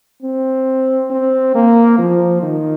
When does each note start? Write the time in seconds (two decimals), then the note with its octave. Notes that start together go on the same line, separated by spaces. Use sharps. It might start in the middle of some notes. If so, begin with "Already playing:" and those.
0.23 C4
1.10 C4
1.55 A#3
1.98 F3
2.43 D#3